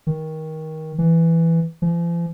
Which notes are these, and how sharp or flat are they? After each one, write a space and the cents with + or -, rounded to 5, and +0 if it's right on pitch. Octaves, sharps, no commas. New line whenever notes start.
D#3 +20
E3 +5
F3 -45